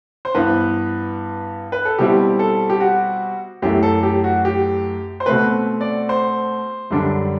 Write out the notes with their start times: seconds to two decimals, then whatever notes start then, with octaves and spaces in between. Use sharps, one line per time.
0.25 C5
0.34 G2 E3 B3 B4
1.72 B4
1.85 A4
1.98 B2 G3 C4 E4 G4
2.39 A4
2.70 G4
2.80 F#4
3.62 F#2 E3 A3 G4
3.83 A4
4.03 G4
4.24 F#4
4.45 G4
5.20 C5
5.26 B2 A3 C4 B4
5.81 D5
6.09 C5
6.90 F#2 D3 G3 D4